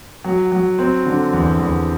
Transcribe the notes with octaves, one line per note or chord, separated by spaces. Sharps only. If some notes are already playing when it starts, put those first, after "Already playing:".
F#3
F#3
C4
D3
E2
E2